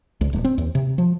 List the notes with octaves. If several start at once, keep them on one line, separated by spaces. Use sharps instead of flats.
C#2
D#1
C4
D#2
C3
F3